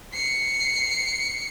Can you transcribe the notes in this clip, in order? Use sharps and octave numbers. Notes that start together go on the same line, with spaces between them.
C7 C#7